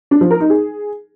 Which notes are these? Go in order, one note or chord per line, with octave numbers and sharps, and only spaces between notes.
D4
F3
A#4
D#4
G#4